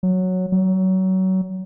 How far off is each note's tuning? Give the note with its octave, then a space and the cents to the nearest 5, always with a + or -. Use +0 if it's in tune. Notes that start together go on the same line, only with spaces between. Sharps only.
F#3 -5
F#3 +25